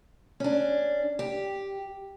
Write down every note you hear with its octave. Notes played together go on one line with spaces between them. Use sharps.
C#4 D4
G4